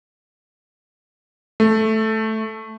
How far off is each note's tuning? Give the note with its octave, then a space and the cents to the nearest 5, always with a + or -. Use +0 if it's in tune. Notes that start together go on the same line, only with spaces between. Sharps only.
A3 -5